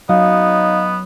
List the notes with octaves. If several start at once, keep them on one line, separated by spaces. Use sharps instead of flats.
F#3 B3 D#4 F5